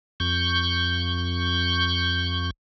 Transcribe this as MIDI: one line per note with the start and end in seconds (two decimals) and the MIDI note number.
0.20 2.50 41
0.20 2.50 85
0.20 2.50 91